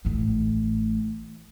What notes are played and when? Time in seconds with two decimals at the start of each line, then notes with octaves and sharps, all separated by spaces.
0.05 A1 A2